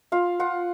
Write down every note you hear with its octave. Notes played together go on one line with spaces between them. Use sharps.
F4 F5
F4 F#5